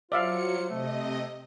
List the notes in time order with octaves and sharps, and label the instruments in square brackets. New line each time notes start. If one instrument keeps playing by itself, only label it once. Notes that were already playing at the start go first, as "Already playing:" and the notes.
[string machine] F#3 C#7 [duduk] F4 [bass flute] C5 [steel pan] D5 E5 F5
[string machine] C3 D#5 [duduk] A3